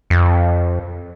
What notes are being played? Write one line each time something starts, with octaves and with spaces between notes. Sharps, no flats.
F2